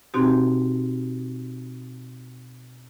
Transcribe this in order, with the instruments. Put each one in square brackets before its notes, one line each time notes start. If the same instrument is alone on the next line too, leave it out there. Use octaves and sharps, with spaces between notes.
[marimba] B2 C4 D#4 F#4 G4